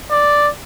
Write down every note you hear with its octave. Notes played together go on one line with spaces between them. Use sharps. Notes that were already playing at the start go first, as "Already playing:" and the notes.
D5